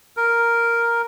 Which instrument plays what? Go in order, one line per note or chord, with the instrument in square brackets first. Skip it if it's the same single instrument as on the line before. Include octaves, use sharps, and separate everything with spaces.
[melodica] A#4